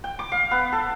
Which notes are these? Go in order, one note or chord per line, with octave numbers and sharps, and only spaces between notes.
G5
D6
F5
B3
A4